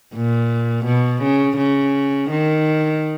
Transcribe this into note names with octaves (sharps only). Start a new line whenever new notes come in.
A#2
B2
C#3
C#3
D#3